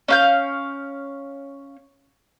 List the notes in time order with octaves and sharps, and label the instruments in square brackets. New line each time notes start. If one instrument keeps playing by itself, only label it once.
[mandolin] C#4 F5 G6